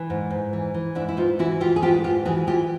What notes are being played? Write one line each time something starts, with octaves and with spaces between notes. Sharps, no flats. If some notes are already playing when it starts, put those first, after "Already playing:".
Already playing: E3
G#2
G#2
E3
E3
G#2 D4 E4
E4
G#2 D#4 F4
E3 E4 F#4
E3 F4 G4
G#4
G#2 F4 G4
G#2 F4 G4
E3 F#4 G#4
E3 F4 G4